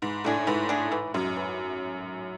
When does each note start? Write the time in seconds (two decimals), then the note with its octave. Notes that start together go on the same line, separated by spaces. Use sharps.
0.02 G#2 E3
0.24 A2 A3 D4 G#4
0.47 G#2 E3
0.69 A3 D4 G#4
0.92 E3
1.14 F#2 G#3 C#4
1.36 E3